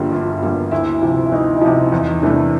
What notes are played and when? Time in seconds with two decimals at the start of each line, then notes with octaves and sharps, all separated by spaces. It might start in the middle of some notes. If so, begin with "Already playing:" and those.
Already playing: G1 G2 D3 G3 A#3 F4 G4 G#4
0.12 G1 F4
0.42 G2 D3 G3 A#3
0.71 D2 E4
1.01 C3 F3
1.26 E4
1.32 D2 D#4
1.57 D#4
1.61 C3 F3 E4
1.92 E2 D#4
2.22 C3 E3 A3 D4